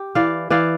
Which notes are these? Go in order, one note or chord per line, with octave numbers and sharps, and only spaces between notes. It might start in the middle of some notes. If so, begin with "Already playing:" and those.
Already playing: G4
E3 D5 F5
E3 D5 F5